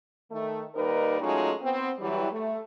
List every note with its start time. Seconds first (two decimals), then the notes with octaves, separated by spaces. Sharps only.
0.31 D#3 A3
0.75 D#3 G3 A#3 D#4 A#4 B4
1.21 F#3 G#3 A3 C#4 D#4 F4
1.62 B3 C4
1.99 E3 F#3 G3
2.32 A3